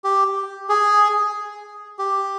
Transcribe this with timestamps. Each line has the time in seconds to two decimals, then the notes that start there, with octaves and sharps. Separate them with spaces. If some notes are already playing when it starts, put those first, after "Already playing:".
0.04 G4
0.69 G#4
1.99 G4